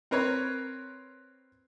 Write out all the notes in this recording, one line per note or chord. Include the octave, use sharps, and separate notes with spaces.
C4 A#4 B4 C#5